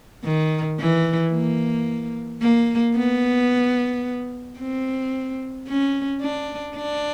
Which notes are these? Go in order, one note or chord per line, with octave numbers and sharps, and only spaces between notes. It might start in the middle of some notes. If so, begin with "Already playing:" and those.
D#3
E3
A#3
A#3
B3
C4
C#4
D4
D4